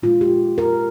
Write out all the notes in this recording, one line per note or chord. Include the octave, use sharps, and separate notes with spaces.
A#2 G#3 F4
G4
A#4